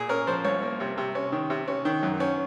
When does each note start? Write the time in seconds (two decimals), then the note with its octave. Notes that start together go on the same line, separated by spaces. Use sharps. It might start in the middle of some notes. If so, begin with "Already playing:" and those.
Already playing: A#2 G#4
0.09 C#4 A#4
0.27 F3 C5
0.45 C2 C#5
0.62 A#3
0.80 C3
0.98 C3
1.15 C#4
1.32 D#3
1.50 C3
1.68 C#4
1.85 D#3
2.03 F#2
2.20 C#4